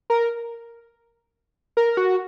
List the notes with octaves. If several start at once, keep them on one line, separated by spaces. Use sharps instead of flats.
A#4
A#4
F#4